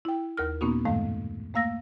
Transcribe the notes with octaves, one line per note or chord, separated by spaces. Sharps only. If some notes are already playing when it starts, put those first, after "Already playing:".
E4 G5
D#2 A#4 F6
A#2 A#3 B3 C#4 D#4 F#4
F#2 A2 D#3 G#3 A3 F5
A3 A#3 F5 E6 A#6